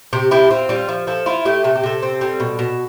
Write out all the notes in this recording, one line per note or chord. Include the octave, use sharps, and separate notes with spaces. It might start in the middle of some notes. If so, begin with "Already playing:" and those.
C3 G4
E4 G4
C4 F4
G3 F4
F3
F3 A4
E4 F4
A3 G4
C3 A4
G4
C3 A4
C4
G3
B2
B2